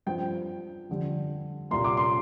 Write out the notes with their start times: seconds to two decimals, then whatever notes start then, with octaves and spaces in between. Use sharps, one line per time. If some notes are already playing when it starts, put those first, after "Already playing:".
0.06 G2 F3 C4 G5
0.89 F2 D3 G3
1.71 C2 A#2 G3 A#3 C6
1.85 D6
1.97 C6